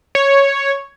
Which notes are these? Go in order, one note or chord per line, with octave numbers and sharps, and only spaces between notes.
C#5